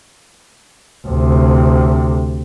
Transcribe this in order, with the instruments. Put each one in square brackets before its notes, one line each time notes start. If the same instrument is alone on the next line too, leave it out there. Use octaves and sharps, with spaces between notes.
[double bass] D2 C3